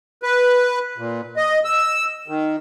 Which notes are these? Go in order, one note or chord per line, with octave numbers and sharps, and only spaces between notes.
B4
A#2
D#5
E6
D#3